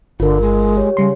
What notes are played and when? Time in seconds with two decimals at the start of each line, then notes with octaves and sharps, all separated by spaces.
0.20 G1 D3 F4 A#4
0.41 G#3
0.76 G4 C#5
0.97 C#3 G3 C6